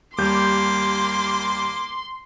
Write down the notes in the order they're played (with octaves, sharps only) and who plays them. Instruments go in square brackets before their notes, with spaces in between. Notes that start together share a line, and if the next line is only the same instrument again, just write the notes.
[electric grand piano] D#2 G3 G6 [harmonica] A#3 D6 [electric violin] C6